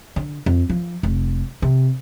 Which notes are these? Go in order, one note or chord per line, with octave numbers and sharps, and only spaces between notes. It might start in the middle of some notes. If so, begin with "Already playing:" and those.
D3
F2
F3
F1
C3